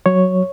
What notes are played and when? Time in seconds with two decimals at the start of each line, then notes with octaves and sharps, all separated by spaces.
0.06 F#3 C#5